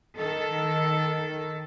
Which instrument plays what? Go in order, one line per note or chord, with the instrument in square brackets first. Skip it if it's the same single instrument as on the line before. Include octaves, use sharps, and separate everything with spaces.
[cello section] D#3 A4